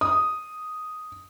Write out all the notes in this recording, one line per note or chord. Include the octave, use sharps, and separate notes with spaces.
D#6